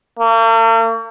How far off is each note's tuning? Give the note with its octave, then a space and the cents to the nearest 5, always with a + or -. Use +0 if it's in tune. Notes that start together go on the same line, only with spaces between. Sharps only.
A#3 -45